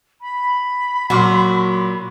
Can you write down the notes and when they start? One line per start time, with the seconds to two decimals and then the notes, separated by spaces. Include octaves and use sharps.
0.21 B5
1.10 A#2 F#3 F#4 C6